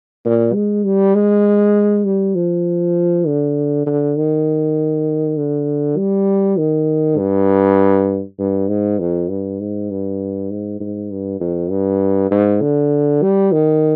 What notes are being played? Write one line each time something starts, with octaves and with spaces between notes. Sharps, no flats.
A#2
G#3
G3
G#3
G3
F3
D3
D3
D#3
D3
G3
D#3
G2
G2
G#2
F2
G2
G#2
G2
G#2
G#2
G2
F2
G2
G#2
D3
G3
D#3